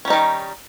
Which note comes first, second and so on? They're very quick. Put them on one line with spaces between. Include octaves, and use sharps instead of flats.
C#4 G3 D#4 D#3